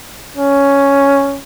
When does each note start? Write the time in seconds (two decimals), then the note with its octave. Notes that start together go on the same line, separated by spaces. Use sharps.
0.37 C#4